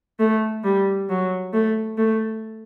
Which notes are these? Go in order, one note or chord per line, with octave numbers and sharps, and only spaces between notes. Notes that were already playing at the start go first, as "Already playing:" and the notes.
A3
G3
F#3
A3
A3